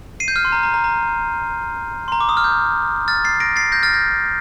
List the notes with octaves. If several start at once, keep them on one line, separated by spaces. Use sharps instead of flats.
C7 D#7
G6
F6
C6
A#5
A#5
A#5
A#5
C6
A#5
D6
D#6
F6
G6
F6 A6
A6 C7
A#6 D7
A6 C7
G6 A#6
F6 A6
G6 A#6